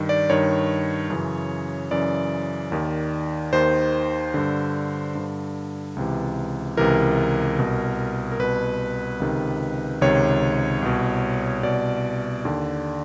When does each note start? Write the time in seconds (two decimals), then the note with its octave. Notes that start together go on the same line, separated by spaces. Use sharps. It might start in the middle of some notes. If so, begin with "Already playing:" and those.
Already playing: G2 D#3
0.09 D5
0.30 G2 D#3 C#5
1.10 F#2 C#3 E3
1.91 F#2 C#3 E3 D5
2.72 D#2 D#3
3.53 D#2 D#3 C5
4.34 G2 D3
5.15 G2 D3
5.96 C#2 C3 E3
6.77 C#2 C3 E3 A#4
7.59 C2 B2
8.32 A#4
8.39 C2 B2 B4
9.20 C#2 C3 D#3
10.01 C#2 C3 D#3 C#5
10.82 C2 B2
11.63 C2 B2 D5
12.45 D#2 D3